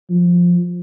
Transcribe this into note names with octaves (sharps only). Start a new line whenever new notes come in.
F3